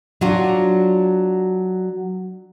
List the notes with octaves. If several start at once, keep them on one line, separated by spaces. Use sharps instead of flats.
F#3 D4 F4 F#4